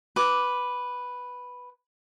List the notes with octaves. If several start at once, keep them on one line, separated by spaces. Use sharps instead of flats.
B4 D6